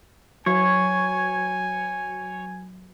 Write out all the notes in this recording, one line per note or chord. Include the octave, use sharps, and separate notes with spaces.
F#3 F#4 C#5 G#5